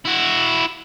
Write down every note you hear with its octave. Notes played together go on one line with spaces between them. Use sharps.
E4 F#4